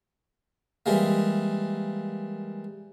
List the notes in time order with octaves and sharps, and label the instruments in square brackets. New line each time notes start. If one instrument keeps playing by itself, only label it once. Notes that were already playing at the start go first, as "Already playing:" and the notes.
[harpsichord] E3 G3 G#3 A#3